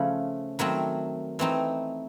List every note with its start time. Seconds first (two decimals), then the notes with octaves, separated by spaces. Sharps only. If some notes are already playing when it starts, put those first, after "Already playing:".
Already playing: C#3 F3 A3 B5
0.59 D#3 F#3 A3 C4 B5
1.39 E3 A3 C4 D#4